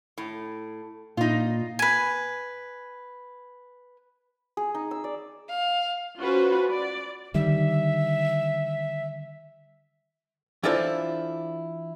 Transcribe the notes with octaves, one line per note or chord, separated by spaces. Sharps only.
A2
A#2 D#4 F4
B4 G#5
G#4
D#4
E6
D5
F5
C#4 F4 F#4 B4 C5
D5
D3 D#3 G3 E5
E3 D4 E4 F4 A4 C5